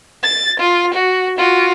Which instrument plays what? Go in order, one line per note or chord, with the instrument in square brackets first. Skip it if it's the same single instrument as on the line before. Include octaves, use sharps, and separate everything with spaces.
[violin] A6
F4
F#4
F4 F#4